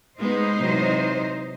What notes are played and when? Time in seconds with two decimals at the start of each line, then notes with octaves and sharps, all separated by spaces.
0.19 G#3 B3 D#4 C5 D#5
0.57 C3 E3 F#3